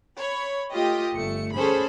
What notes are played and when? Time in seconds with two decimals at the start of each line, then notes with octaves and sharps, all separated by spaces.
0.19 C#5 B5
0.72 A3 F4 G4 D#5
1.16 G1 A3 C#7
1.54 C#4 G#4 A4 C5 B5